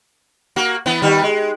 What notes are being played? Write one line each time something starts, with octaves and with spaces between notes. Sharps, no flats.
A#3 F#4
E3 B3
D#3 G3 B3
G#3